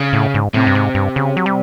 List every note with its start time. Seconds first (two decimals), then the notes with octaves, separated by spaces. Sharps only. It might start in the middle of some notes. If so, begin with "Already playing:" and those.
Already playing: C#3
0.13 A2
0.34 G#2
0.54 A2 C3
0.67 G2
0.75 G#2
0.95 G2
1.16 C#3
1.37 F#3
1.46 G3